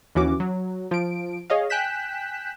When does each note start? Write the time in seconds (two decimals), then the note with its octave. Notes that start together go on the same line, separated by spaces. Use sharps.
0.15 D#2 E3 C#4 F#4 D6
0.40 F#3
0.91 F3 D7
1.50 G#4 C#5 D#5 F5
1.70 G5 G#5 F#6 G6 B6 E7